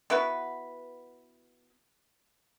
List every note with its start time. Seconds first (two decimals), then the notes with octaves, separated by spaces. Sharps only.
0.10 B3 E4 F#4 B4